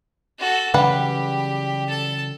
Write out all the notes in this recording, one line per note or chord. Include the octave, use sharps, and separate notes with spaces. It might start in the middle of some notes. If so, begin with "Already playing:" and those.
F#4 A4
C#3 E3 F#3 G3 G4 B4 F#5
A4 A5